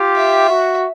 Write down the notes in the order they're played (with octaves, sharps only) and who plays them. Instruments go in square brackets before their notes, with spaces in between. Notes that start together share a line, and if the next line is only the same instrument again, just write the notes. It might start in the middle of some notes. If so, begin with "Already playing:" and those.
Already playing: [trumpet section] F4 G4
[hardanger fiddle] E5
[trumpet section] F#4